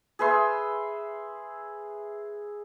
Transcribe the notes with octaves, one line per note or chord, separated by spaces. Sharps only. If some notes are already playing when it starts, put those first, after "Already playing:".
G#4 B4 E5 C6